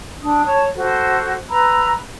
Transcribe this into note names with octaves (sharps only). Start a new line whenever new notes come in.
D4 D#6
C#5 A5
F#4 A4 C5
B4 A#5 B5 E6